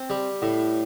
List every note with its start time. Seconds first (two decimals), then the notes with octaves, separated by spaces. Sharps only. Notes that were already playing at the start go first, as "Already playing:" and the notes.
Already playing: C4
0.10 G3
0.42 A2